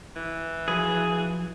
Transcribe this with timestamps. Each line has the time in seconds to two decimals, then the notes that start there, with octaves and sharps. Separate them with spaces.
0.16 E3
0.68 F3 F#3 G#4 B4